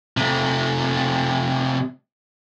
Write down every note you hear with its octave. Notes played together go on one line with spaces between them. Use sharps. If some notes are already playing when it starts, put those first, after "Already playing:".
C3 A3